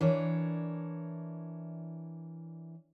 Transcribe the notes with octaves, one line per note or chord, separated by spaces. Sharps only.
E3 D4 A#4 C#5